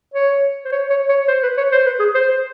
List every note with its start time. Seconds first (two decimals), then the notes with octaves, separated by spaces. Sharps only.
0.14 C#5
0.65 C5
0.72 C#5
0.90 C#5
1.09 C#5
1.28 C5
1.43 B4
1.57 C#5
1.72 C5
1.86 B4
2.00 G#4
2.14 C5
2.29 C5